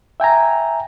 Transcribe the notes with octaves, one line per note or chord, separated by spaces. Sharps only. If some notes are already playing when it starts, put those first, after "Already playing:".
E5 G5 G#5 A#5